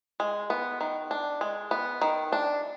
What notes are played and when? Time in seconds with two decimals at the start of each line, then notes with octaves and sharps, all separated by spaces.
0.20 G#3
0.50 B3
0.81 D#3
1.11 D4
1.41 G#3
1.71 B3
2.01 D#3
2.32 D4